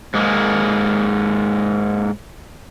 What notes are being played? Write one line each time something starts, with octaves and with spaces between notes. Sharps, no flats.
G#2 G#3 A#3